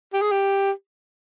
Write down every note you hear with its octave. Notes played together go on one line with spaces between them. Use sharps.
G4
G#4
G4